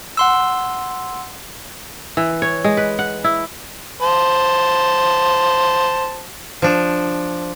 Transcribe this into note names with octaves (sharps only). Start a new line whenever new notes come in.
F#5 C6 E6
E3
C#5
G#3
B4
F#5
E4
C5 A5
F3 D4